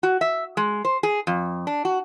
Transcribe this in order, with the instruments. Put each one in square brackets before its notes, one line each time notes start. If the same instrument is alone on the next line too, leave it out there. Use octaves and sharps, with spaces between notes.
[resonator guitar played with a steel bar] F#4
E5
G#3
C5
G#4
F2
D4
F#4